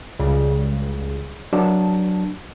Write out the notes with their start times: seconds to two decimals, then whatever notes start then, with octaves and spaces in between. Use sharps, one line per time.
0.19 C#2 C#3 G3
1.53 F#3 D4 A5